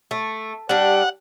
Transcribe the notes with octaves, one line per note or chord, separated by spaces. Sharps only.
A3
G3 D4 F#5